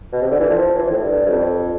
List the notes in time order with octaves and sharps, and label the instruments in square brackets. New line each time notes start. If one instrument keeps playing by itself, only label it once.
[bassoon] B2
C3
D3
E3
F3
E3
A2
G2
G2
F2